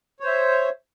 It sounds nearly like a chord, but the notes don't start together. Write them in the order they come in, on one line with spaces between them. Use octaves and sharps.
C#5 C5 E5